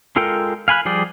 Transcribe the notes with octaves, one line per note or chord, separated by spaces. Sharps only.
G#3 F4 A4 A#4 G5
F5 G#5 B5 F#6
F3 G3 G#4 D5 G5